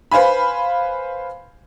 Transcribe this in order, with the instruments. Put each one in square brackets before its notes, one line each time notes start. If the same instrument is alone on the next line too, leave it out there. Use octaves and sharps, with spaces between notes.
[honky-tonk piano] B4 C5 F5 G#5 B5